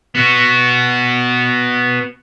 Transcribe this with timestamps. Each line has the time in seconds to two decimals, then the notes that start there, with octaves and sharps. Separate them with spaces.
0.15 B3 F#4